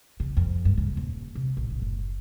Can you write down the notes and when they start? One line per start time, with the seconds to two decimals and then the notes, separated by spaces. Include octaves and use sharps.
0.20 C#3
0.37 F2
0.65 G2
0.77 C#3
0.97 D#1
1.35 C3
1.57 A#1
1.70 A#1
1.82 F#1